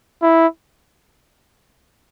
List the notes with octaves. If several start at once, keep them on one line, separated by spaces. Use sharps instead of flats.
E4